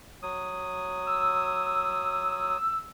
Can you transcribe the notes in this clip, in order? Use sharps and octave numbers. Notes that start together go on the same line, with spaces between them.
F#3 D#6
E6